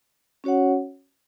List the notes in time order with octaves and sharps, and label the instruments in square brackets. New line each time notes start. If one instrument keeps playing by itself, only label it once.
[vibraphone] C#4 F#4 C#5 F#5